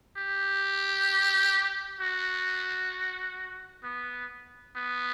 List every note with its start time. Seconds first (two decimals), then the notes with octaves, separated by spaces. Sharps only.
0.17 G4
2.00 F#4
3.83 B3
4.76 B3